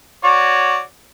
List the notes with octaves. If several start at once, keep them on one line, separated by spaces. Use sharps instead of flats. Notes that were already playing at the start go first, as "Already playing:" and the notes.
F#4 C#5 D5